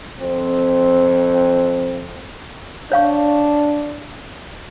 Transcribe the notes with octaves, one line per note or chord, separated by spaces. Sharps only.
F2 C4
D4 C#5 F5 C#6